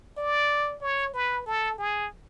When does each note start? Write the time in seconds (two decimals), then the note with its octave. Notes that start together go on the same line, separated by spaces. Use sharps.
0.18 D5
0.82 C#5
1.14 B4
1.46 A4
1.78 G#4